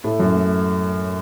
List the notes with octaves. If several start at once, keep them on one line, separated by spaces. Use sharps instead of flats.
A2 A3
F#2 F#3
A2 A3